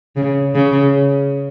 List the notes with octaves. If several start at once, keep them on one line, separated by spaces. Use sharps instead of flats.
C#3
C#3